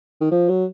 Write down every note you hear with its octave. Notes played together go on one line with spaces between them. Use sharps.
D#3
F3
F#3